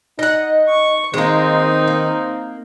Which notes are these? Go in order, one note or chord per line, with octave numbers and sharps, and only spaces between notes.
D#4 D#5 F#5
C#6
D#3 G#3 A#3 C4 D#4
A#3